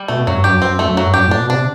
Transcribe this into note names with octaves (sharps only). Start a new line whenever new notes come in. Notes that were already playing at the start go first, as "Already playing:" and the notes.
Already playing: G3
B2 A3
F#2 F#3
G2
F#2 G4
F#2 C4
A3
F#2
F#3
G2
F#2 G4
A2 D4
B2
C3 D4